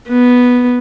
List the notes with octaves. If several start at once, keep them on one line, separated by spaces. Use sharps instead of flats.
B3